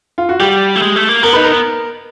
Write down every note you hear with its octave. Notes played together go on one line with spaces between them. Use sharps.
F4
F#4
G3 G4
A3
G#3
A3
A#3
B3 A#4
D#4 B4
A#4